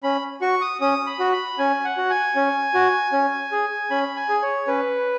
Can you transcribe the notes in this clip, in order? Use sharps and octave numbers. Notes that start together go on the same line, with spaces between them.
C#4 B5
F#4 C#6
D#6
C#4 D#6
B5
F#4
B5
C#4 G#5
F#5
F#4
G#5
C#4
F#4
C#4
G#4
C#4 B5
G#5
G#4
C#5
C#4 B4